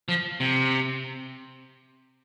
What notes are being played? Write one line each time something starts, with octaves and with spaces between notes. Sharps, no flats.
F3
C3